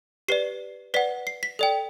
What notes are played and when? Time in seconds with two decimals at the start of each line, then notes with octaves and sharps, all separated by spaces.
0.28 G4 B4 D5 C7
0.94 B4 D5 F#5 B6
1.27 C7
1.43 B6
1.59 A4 D5 G5